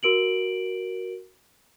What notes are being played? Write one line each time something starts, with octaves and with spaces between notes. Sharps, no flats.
F#4 A#4 D7 F#7